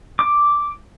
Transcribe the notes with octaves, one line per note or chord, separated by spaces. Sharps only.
D6